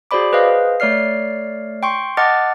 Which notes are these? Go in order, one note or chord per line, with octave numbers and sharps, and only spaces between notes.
F#4 G#4 C5 D5 B5 D6
G#4 B4 C5 D#5 F5
A3 C#5 D5 F6 C7
G5 C6 C#6
D#5 F#5 A5 D6 F6 A6